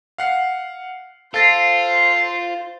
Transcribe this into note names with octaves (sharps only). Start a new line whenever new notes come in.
F5 F#5 C7
F4 A4 C5 A6 A#6 C7